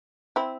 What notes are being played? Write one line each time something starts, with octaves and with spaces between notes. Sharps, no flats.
C4 E4